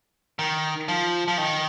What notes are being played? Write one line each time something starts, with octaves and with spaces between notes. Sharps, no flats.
D#3
F3
F3
D#3